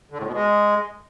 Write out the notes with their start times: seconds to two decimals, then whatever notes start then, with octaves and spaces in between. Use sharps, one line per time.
0.11 D3
0.19 A2
0.26 B2
0.34 G#3